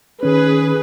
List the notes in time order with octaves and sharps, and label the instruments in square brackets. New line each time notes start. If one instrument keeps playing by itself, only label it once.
[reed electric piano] D#3 C#4 [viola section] G#4 B4